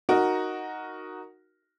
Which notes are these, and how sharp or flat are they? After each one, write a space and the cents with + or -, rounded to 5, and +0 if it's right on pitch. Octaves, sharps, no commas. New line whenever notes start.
D#4 +0 F#4 +0 A#4 +0